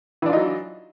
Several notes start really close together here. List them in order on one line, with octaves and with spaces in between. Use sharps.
E3 D4 F4 D#4 F#3